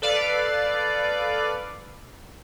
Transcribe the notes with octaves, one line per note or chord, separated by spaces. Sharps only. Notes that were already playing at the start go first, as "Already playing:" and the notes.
A4 B4 D5 F5